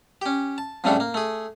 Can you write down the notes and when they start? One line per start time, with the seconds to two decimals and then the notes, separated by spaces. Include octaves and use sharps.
0.22 C#4 G4
0.58 A5
0.84 F2 A2 C#3 G3 A3 D4
1.00 A#3
1.14 A3 G#4